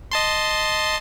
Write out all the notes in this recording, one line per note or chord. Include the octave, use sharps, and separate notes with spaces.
D#5 A5 C6